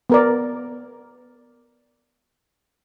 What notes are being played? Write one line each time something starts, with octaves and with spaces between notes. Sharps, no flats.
B3 A#4 D5